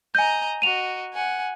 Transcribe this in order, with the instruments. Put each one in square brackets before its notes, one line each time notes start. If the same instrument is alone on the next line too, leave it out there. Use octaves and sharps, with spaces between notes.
[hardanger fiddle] D#5 A#5 [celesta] G#5 G6
[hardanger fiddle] F#4 D#5 [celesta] D#7 F7
[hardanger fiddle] F#5 G#5